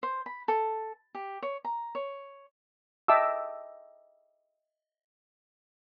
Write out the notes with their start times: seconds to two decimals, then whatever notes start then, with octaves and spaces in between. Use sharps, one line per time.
0.03 C5
0.26 B5
0.48 A4
1.15 G4
1.42 C#5
1.65 A#5
1.95 C#5
3.08 D#5 E5 G5 A5 D6 E6